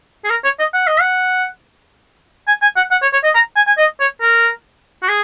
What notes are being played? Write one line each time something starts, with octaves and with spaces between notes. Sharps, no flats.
G#4
A#4
C#5
D#5
F#5
D#5
F#5
G#5
G#5
F#5
F#5
C#5
C#5
D#5
A#5
G#5
G#5
D#5
C#5
A#4
F#4
G#4